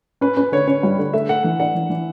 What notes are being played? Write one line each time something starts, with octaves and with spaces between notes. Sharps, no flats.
C#4 B4
C#4 B4
D3 C#5
C#4 C#5
G2
D3
A3 E5
A3 F#5
E3 F#5
D4 F#5
E3
E3